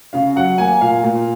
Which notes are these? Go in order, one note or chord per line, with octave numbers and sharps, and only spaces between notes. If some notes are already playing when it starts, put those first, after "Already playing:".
C#3 F5
F#3 F#5
A#3 G#5
A#2 F5
A#2